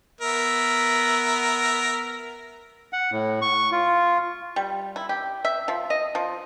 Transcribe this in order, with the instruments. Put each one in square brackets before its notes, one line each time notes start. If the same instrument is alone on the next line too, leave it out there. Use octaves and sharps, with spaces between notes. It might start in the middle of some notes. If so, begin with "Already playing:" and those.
[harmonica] B3 A#4 E5
[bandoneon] F#5
A2
C#6
F4
[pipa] G3
E4
G4
E5
F3
D#5
F3